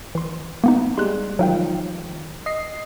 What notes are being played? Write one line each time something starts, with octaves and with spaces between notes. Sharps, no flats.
E3 C6
A#3 B3 D#4
G3 G#3 C6 F#6
D#3 F3 F#3 F5 G5
D#5 C7